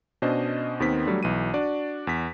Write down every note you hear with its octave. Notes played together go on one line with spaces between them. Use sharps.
B2 C#4 D4 C5 D#5
D#2 D#3 B3 C4 B6
F#3 G3 A3 D4
B1 E3 D#7
D4 F#4 D5
E2 B6